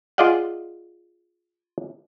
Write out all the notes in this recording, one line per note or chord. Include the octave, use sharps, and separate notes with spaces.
F4 G#4 D5 D#5 F5 F#5